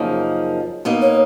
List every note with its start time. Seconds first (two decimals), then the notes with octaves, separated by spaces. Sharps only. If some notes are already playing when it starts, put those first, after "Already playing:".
Already playing: F#2 C#3 F3 A#3 D#4
0.85 B2 A#3 D#4
1.02 C#5